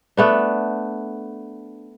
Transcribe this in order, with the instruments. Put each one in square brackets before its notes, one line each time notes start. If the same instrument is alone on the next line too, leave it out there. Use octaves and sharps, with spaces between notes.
[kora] A3 B3 D4